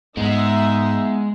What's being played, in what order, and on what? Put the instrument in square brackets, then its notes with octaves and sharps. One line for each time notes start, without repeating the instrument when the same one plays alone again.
[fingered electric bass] G#2 [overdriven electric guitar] G#3 [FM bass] B3 [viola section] D#4 E5